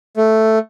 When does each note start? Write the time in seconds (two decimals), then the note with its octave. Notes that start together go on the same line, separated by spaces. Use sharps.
0.17 A3